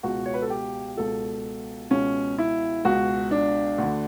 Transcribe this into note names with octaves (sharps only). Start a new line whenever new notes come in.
C#2 B2 F#4
C#5
B4
A4
G4
C#2 B2 A4
C#2 B2 C#4
E4
C#2 B2 F#4
D4
D2 D3